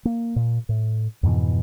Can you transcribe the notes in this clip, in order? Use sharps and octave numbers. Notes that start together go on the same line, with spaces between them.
A#3
A#2
A2
F2 G#2 B2 E3